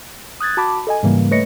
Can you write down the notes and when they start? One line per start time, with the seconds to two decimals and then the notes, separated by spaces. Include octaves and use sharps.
0.40 D#6 F#6 G#6 A6
0.57 F#4 A5 B5 D6
0.87 A4 D#5 G#5
1.03 G#2 C#3 E3 G3 A#3
1.31 A3 B4 C#5 D#5 A#6 C#7